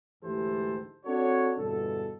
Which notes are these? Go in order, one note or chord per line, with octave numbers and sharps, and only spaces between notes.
D2 G#2 E3 G4 A4 C5
C4 D4 F#4 A4 C#5
G1 E2 B2 A4